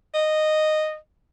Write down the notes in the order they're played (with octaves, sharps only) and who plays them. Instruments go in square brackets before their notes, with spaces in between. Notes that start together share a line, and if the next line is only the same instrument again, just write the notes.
[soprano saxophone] D#5